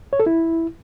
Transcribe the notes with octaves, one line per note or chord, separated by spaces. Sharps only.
C#5
A4
E4